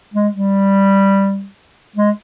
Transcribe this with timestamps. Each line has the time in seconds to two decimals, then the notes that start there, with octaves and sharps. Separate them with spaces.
0.14 G#3
0.33 G3
1.96 G#3